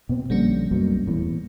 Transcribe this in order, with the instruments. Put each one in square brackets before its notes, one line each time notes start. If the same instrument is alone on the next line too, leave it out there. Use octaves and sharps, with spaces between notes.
[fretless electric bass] B2 B3 C4
[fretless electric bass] A#1 D3 [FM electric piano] G3 A#3 C#4
[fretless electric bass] C2 F#2 B2
D#1 E2 A2